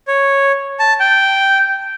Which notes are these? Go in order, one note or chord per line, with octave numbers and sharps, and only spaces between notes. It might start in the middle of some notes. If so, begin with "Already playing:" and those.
C#5
A5
G5